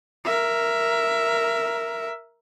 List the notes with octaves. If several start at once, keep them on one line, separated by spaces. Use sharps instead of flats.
A#4 E5